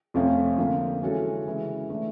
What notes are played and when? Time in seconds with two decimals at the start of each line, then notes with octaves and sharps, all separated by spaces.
0.14 F2 C3 F3 A3 C#4
0.58 D3 F3 A#3
1.02 E3 G#3 C#4 F#4 A4
1.46 C#3 E3 G#3
1.90 E3 A3 D4